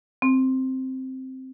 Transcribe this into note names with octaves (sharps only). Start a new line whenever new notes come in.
C4